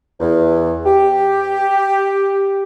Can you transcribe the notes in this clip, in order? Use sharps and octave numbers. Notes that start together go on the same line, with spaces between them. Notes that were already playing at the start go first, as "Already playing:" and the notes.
E2
G4